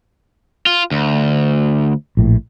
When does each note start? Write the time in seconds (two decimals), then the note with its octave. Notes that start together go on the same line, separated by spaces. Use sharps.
0.66 F4
0.91 D2
2.17 A#1 A2